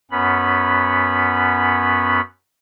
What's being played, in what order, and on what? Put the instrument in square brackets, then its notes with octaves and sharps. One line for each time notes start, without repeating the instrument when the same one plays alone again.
[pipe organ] F#2 B3 C#4 B5